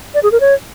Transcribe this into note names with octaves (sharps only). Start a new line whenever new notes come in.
D5
G#4
A#4
C#5